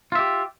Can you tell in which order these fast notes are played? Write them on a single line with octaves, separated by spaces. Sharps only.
F4 E5 G4